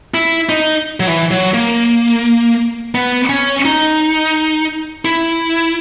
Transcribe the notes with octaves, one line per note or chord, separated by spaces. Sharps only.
E4
D#4
F#3
E3
F#3
A#3
B3
C#4
D#4
E4